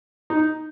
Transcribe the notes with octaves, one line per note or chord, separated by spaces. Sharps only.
D#4